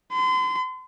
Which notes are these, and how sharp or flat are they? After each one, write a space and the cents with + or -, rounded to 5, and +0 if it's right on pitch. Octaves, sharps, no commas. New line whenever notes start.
C6 -40